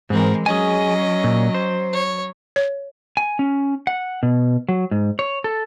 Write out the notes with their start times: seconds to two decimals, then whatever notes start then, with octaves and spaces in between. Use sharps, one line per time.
0.10 G#2 E3 G#3 C4 A#4
0.46 F#3 C#4 G#4 D#5 G#5
1.24 A#2
1.54 C5
1.94 C#5
2.56 C#5
3.17 G#5
3.39 C#4
3.87 F#5
4.23 B2
4.69 F#3
4.91 G#2
5.19 C#5
5.44 A4